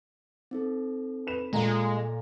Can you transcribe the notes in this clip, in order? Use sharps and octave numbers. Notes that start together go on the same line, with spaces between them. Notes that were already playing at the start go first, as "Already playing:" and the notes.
C4 D#4 A4
B4 E7
A#2 G#3 A4 D#5 F5 A#5